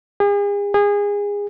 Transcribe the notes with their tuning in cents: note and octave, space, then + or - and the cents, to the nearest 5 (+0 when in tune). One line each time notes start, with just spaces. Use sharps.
G#4 -40
G#4 -25